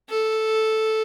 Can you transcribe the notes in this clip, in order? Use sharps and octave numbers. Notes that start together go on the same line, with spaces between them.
A4